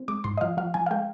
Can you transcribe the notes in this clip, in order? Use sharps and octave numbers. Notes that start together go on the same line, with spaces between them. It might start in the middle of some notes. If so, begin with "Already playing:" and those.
Already playing: C4
G#3 D6
G#2 C6
D#5
F3 F5
F3 F5
F3 G#5
F5
G#3 G5